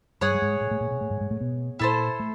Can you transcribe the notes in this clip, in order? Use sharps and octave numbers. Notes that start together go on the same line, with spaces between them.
G2 G3 G#4 C#5 F#5
G3
G#2 G#3
A2 A3
A2 A3
A#2 A#3
B2 B3
A2 A3
G#2 G#3
G#2 G#3
A2 A3
B2 B3
A#2 A#3 E4 A4 C5
A3